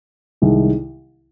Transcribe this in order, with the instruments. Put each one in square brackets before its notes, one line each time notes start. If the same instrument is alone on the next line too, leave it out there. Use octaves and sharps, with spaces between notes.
[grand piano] C2 C3 D#3 G#3